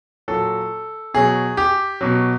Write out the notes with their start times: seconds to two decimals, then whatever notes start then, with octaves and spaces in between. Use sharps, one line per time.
0.28 A#2 F#3 A4
1.14 B2 F#3 G#4
1.57 G4
2.01 B2 F#3